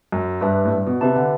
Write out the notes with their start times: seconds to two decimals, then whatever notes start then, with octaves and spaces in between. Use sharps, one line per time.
0.12 F#2
0.41 G2 D4 G4 B4 E5 A5
0.65 A2
0.71 G2
0.86 B2
1.01 C3 G4 B4 E5 A5
1.16 D3